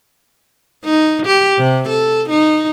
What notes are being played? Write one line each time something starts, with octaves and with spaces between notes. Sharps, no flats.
D#4
G4
C3
A4
D#4